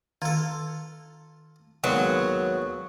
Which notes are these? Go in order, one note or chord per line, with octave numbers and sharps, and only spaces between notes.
D#3 F4 A4
D#2 B2 F#3 G#3